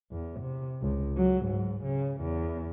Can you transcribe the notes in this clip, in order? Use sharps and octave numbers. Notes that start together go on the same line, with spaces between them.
E2
C3
C#2
F#3
G#2
C#3
E2